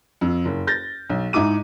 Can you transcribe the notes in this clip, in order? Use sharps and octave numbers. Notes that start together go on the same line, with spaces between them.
F2
F#1
G6 A6 A#6
B1
G#2 D#4 E4 D6 D#7